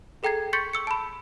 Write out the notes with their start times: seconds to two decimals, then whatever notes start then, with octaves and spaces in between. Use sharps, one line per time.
0.23 G#4 A4 G5 A#5 G#6 C7
0.53 C6 C#6 G6 A6 B6 C#7
0.73 C#6 E6 C#7
0.87 A5 B5